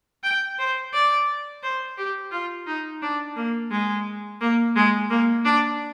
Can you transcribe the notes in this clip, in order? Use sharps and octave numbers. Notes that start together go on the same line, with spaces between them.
G5
C5
D5
C5
G4
F4
D#4
D4
A#3
G#3
A#3
G#3
A#3
D4